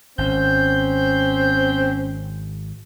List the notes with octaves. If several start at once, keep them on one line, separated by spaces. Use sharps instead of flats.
G#1 C4 C#4 G6